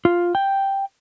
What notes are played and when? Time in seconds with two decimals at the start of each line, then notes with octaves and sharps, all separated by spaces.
0.05 F4
0.35 G5